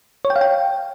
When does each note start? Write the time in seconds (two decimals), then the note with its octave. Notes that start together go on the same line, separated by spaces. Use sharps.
0.25 C#5
0.30 G5
0.36 F5
0.41 G5